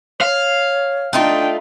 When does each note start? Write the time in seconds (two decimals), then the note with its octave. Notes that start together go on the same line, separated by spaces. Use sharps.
0.21 C#5 F5
1.13 A3 D4 D#4 F4 G5